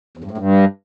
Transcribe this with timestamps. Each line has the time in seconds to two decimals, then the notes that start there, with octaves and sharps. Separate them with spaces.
0.17 E2
0.24 G2
0.31 A2
0.38 G2